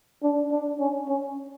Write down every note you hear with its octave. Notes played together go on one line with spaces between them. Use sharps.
D4
D4
C#4
C#4